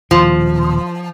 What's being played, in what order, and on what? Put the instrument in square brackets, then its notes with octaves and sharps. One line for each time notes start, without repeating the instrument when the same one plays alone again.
[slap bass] D#1 D#2 B2 [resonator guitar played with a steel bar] F3